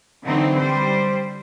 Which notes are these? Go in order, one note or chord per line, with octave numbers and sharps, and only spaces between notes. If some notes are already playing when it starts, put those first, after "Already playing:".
D3 E3 F#3 C4 D#4
G3 C5